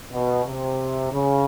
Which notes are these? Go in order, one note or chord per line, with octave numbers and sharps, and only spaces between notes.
B2
C3
C#3